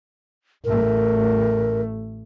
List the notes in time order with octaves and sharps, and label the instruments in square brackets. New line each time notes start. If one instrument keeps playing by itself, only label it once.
[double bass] A1 A3 [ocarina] A#4